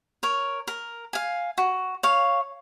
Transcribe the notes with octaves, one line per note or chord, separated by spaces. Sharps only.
A#4 C#5
A#4
F5 G#5
F#4
C#5 F5